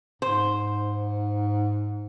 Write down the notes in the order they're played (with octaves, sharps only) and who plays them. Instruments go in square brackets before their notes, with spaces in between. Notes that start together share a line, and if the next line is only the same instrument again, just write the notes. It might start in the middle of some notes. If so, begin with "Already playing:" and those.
[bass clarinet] G#2 [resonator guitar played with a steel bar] C5